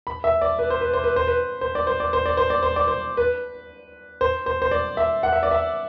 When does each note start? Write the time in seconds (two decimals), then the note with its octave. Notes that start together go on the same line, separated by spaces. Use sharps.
0.07 B5
0.24 E5
0.41 D5
0.59 B4
0.70 C5
0.81 B4
0.93 C5
1.04 B4
1.16 C5
1.27 B4
1.61 C5
1.75 D5
1.87 C5
2.00 D5
2.13 C5
2.26 D5
2.37 C5
2.50 D5
2.63 C5
2.76 D5
2.88 C5
3.17 B4
4.21 C5
4.46 C5
4.62 C5
4.71 D5
4.97 E5
5.23 F#5
5.32 E5
5.43 D5
5.51 E5